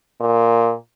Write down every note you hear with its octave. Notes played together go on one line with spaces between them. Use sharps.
A#2